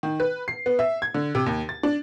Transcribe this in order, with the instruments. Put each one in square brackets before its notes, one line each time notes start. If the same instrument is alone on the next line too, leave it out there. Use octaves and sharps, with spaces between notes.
[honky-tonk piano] D#3
B4
C7
B3
E5
G#6
D3
C3
D#2
A6
D4